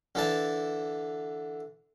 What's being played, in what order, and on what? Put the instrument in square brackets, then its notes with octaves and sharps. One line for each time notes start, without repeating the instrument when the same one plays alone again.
[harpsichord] D3 E3 A5